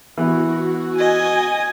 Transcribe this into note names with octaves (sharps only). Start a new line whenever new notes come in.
E3 B3 E4 F#4
D#5 G#5